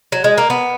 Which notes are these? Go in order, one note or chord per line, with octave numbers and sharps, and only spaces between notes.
F#3
G#3
A#3
B3